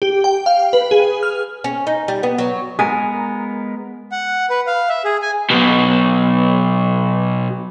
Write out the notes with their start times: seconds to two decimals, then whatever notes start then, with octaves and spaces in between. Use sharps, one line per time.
0.02 G4
0.24 G5
0.46 F5
0.73 B4
0.91 G#4
1.23 F6
1.64 C#4
1.87 D#4
2.08 G3
2.23 B3
2.38 F#3
2.79 G#3 B3 A#4 G#5
4.12 F#5
4.50 B4
4.67 F5
4.89 E5
5.05 G#4
5.22 G#5
5.50 B1 B2